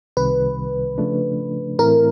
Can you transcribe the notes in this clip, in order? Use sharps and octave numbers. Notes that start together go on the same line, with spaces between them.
C2 C3 D#3 G3 B4
C#3 F3 A3 D4
A2 E3 A3 C4 E4 A#4